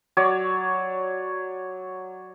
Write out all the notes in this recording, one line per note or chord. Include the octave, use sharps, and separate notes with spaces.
F#3 C#5 D5